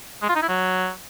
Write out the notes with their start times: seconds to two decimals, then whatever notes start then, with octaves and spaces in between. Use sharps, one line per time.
0.22 G#3
0.29 F4
0.36 D#4
0.42 E4
0.49 F#3